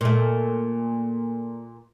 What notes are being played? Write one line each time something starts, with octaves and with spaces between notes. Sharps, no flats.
A#2 A3